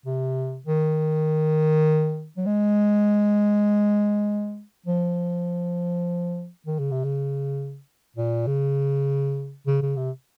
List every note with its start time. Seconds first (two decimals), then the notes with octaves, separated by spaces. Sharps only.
0.06 C3
0.66 D#3
2.37 F#3
2.46 G#3
4.86 F3
6.67 D#3
6.79 C#3
6.91 C3
7.04 C#3
8.16 A#2
8.47 C#3
9.67 C#3
9.82 C#3
9.97 C3